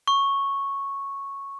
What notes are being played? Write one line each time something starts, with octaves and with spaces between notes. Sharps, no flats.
C#6